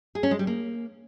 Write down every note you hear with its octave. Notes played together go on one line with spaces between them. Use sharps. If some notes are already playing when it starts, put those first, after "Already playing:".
G#4
C#4
G#3
G3
A#3